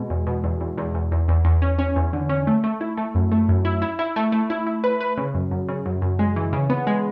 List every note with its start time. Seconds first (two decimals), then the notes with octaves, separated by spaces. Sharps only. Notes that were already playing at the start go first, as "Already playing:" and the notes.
Already playing: B2 G#3
0.10 E2
0.27 B2
0.44 E2
0.61 E2
0.78 E2
0.94 E2
1.12 E2
1.28 E2
1.45 E2
1.62 C#4
1.79 C#4
1.96 E2
2.13 D3
2.29 C#4
2.47 A3
2.64 A3
2.81 E4
2.97 A3
3.15 F#2
3.32 A3
3.48 F#2
3.65 E4
3.82 E4
3.99 E4
4.16 A3
4.32 A3
4.50 E4
4.67 E4
4.84 B4
5.00 B4
5.17 C#3
5.34 F#2
5.51 F#2
5.68 C#3
5.86 F#2
6.02 F#2
6.19 G#3
6.36 E3
6.53 C#3
6.70 B3
6.87 G#3